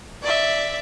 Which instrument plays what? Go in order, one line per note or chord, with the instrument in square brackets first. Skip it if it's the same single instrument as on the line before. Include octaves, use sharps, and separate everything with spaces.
[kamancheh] D5 E5